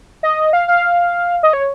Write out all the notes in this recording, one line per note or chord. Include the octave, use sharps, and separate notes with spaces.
D#5
F5
F5
D#5
C#5